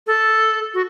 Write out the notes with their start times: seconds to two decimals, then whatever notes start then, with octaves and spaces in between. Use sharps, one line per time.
0.07 A4
0.74 F#4